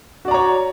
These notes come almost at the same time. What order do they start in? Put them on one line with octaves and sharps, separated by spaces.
F#4 D5 A#5 C#5